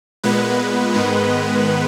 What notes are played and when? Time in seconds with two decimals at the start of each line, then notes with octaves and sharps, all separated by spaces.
0.24 A#2 G#3 B3 B4
0.94 G#2 D#3 G#3 B3